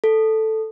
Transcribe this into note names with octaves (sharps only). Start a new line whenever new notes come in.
A4